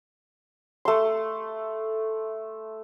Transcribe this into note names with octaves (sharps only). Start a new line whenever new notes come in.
A3 C6